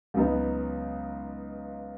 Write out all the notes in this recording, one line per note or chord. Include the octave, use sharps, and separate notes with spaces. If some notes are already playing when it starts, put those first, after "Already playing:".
C#2 C#3 F#3 B3 D#4